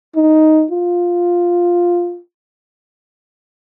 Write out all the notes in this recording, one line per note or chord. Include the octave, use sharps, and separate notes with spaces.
D#4
F4